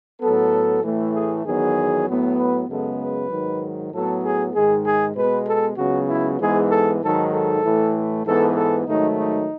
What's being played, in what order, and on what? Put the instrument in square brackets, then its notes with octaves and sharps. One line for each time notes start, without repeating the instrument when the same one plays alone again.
[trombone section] A2 F#3 B3 A4
A2 E3 A3
G#4
E2 D#3 F#3 B3 G#4
A2 F#3 B3
B4
F#2 C#3 G#3 B3 A4
B4
G#2 D#3 F#3
A2 F#3 B3 A4
G#4
G#2 D#3 G#3 G#4
G#4
B2 G#3 B3 B4
A4
C#2 C#3 F#3 B3 F#4
E4
G#2 E3 G#3 B3 G#4
A4
G#2 D#3 F#3 A4
A4
A2 E3 A3
G#2 E3 B3 A4
A4
G#2 D#3 F#3 A3 D#4
D#4